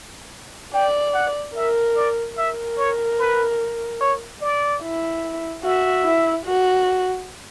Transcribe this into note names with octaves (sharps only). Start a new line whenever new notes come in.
D5 G5
F#5
A#4 E5
D5
A#4 E5
C#5
B4
C#5
D5
E4
F#4 E5
E4
F#4